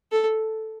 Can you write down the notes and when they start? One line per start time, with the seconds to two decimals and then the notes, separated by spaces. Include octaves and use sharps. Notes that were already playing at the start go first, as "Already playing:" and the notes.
0.12 A4